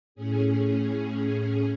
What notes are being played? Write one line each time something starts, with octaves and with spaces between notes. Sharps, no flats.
A2 C#4 G#4